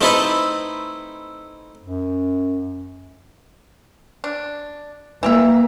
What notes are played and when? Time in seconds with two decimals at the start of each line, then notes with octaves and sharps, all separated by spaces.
0.01 A3 C4 D#4 E4 A4 B4
1.83 F#2
4.24 D4
5.23 E3 A#3 G4 E5